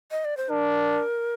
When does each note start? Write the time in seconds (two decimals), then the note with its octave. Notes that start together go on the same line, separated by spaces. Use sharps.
0.11 D#5
0.25 D5
0.37 C5
0.49 D4 A#4